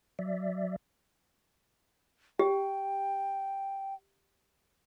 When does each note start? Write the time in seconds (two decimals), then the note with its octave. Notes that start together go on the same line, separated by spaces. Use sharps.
0.19 F#3 D5 E5
2.39 G4 G5